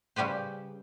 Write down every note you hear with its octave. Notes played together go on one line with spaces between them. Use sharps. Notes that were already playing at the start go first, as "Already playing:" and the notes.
C#3 G3 G4 B4 C5